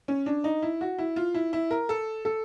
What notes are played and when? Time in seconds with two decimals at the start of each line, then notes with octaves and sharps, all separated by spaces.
0.08 C#4
0.26 D4
0.44 D#4
0.62 E4
0.81 F#4
0.99 E4
1.16 F4
1.34 E4
1.53 E4
1.71 A#4
1.89 A4
2.25 A4